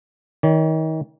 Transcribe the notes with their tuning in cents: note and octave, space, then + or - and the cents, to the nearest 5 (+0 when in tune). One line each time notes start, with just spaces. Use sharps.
D#3 +35 C#5 +45